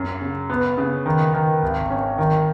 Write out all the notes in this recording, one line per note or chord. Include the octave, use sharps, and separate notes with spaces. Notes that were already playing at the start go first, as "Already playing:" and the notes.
Already playing: F#2
C#3
B3
C#3
D#3
D#3
G#1
C#4
D#3